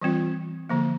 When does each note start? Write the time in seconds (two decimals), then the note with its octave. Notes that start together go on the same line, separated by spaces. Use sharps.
0.01 E3 G3 C4 F4
0.69 D3 F3 A#3